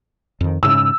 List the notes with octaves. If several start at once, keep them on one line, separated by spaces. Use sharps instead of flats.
F2 D#3
G#2 C#3 E6